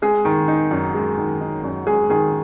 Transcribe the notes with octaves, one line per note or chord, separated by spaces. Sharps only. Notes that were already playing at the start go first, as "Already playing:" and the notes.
G#3 G#4
D#3
D#4
F#2
G#3
D#3
D#4
F#2
G#3 G#4
D#3 G#4